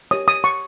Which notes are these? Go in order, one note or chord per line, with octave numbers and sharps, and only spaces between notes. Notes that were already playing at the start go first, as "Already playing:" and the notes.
G4 A#4 C#5 D#6
D#6
C#6